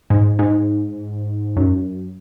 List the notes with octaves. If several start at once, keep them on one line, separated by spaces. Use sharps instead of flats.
G#2
G#2
F#2